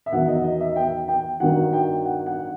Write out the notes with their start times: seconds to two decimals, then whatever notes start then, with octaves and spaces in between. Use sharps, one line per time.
0.06 E5
0.12 E2 D#3 F#3 F#5
0.28 D#5
0.44 D#5
0.61 E5
0.76 G5
1.08 G5
1.40 G2 D#3 F#3 F#5
1.73 G5
2.05 F#5
2.26 F#5